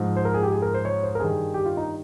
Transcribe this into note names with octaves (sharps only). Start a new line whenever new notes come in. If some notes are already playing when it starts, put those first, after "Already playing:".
Already playing: G#2 F3
C5
A#4
G#4
G4
G#4
A#4
C5
C#5
C5
A#4
G2 D#3 G#4
G4
F4
D#4